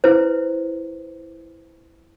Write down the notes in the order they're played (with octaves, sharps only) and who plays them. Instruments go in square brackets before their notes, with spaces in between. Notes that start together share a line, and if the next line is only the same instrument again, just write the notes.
[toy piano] E4 B4 C5